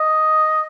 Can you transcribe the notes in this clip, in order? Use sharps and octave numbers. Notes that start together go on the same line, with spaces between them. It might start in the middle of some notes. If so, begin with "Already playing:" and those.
Already playing: D#5